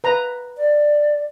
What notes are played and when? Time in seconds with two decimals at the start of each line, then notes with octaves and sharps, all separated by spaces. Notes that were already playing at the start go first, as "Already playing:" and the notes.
0.04 B4 A#5
0.57 D5